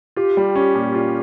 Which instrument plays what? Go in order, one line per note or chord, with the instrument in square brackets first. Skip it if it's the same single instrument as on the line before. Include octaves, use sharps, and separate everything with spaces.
[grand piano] F4 [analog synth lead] G4
[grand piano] G3
C#4
A#2
F4